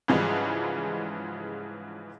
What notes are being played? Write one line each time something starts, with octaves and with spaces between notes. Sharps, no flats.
G#2 C#3 E3 F3 G3 G#3